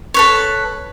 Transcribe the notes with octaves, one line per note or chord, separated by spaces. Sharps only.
A4 B4 C#5